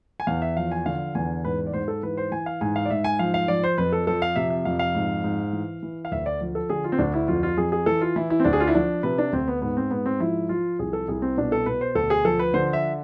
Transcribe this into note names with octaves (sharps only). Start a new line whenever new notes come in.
G#5
E2 F5
E5
F3 F5
G#5
D3 F5
E2 G#5
G#2 B4
D5
G#2 C5
A4
E3 B4
C5
E3 G#5
F5
G#2 G#5
F5
D5
G#2 E5
G#5
F3 F5
F5
F3 D5
C5
F2 B4
A4
F3 A4
F5
C3 E5
E5
F2 F5
F5
G#2
G#2
E3
E3
F5
D2 E5
D5
F3
A4
D3 G#4
F4
C4
D2 D4
E4
F2 F4
F4
F2 G#4
G#4
E3 A4
F4
E3 E4
E4
C4
D2 D4
G#4
F4
E4
F3 D4
C3 B4
D4
D2 C4
B3
G#2 B3
C4
G#2 B3
C4
F3 E4
F3 F4
C2 G#4
A4
C2 G#4
C4
B2 D4
A4
B2 B4
C5
D2 A4
G#4
F3 A4
B4
D3 C5
E5